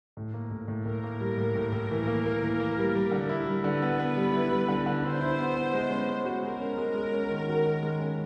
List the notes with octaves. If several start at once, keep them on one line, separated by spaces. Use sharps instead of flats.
A2
A#3
A2
A2
A2 A#4
A#3
G3
A2
A2
A2
E3
A#3
A#3
E3
A#3
G3
G3
D3
E4
G3
D3 B4
B3
B3
G3
E4
G3
D3
D3
D3 C5
E4
B3
B3
G#3
C#4
G#3
F#4
G#3 A#4
C#4
G#3
G#3
C#4
D#3
F#4
D#3
G#3
C#4